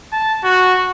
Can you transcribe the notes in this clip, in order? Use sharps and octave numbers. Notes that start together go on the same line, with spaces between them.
A5
F#4